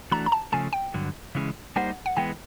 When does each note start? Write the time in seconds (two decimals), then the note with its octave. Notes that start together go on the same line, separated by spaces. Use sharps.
0.12 E3 A3 D4 F#4 A#5
0.26 A#5
0.32 A5
0.52 C#3 F3 A3 G#5
0.73 G5
0.94 G2 D3 F#3
1.35 C#3 E3 G#3 C#4
1.76 G3 A#3 D#4 G4 C5 F#5
2.06 F#5
2.17 E3 G#3 B3 G5